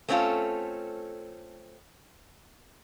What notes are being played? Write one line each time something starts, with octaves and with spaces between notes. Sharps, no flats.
A3 C4 C#4 D#4 F4 A4